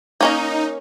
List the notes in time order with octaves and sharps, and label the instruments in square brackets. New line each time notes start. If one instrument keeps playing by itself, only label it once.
[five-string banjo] A#3 C#4 A#4 [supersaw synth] D#4